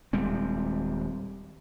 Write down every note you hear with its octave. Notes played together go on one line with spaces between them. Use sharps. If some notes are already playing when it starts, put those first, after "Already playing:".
D#1 G3 G#3 C4